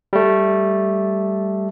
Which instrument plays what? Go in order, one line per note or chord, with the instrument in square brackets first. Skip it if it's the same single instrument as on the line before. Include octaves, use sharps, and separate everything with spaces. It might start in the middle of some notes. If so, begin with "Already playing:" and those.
[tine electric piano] G3 A3